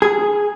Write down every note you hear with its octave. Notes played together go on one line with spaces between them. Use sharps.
G#4